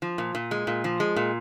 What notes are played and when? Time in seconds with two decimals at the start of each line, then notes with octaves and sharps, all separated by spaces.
0.02 F3
0.18 A#2
0.35 A#2
0.51 G#3
0.67 A#2
0.84 F3
1.00 G#3
1.16 A#2